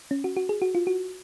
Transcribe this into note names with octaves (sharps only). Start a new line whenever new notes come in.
C#4
F#4
F#4
G#4
F#4
F4
F#4